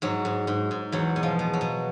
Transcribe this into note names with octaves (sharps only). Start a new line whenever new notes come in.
G#2 F#3
G#2
G#2
G#2
E2 F#3
B2
F3
B2
F#3
B2